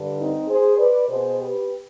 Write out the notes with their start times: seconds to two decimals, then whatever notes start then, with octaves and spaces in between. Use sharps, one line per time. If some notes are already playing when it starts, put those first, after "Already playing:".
Already playing: G2 D3 G3
0.18 C4 D#4
0.48 G#4 C5
0.78 B4 D5
1.09 B2 B3 G#4 C5
1.39 G4 B4